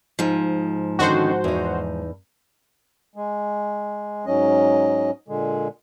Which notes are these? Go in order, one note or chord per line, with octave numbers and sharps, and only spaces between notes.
G#2 F3
D3 D#3 C#4 F#4 C5
E2 D#4
G#3
G#2 F#3 C#4 D#5
A#2 D3 G#3